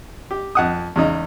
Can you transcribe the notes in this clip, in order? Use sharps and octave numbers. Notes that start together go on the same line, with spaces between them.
G4
F2 F#5 D#6
E2 C#3 D#4